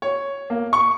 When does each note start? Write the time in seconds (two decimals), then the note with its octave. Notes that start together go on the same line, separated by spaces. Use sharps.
0.02 C#5
0.50 A#3
0.73 C#6